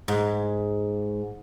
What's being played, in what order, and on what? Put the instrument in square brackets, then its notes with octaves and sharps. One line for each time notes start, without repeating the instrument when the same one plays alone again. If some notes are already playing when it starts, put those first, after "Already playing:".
[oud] G#2